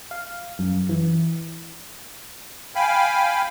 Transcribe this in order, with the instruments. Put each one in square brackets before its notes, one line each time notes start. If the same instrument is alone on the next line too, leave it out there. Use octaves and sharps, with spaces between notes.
[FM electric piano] F5
F#2
E3
[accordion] F5 G5 G#5 B5